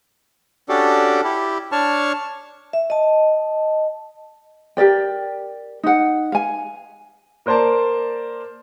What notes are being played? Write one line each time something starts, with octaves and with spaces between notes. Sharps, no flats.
C#4 D4 F#4 G4 A4 D5
E4 G4
D4 C#5 A5 C#6 F6
E5
D#5 A5
G4 A#4 D5 G5
D#4 F#5
F5 G#5
A#3 A#4 C5 D5 A5